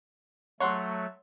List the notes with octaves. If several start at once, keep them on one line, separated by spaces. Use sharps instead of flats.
F#3 A3 C#5 F#5 C6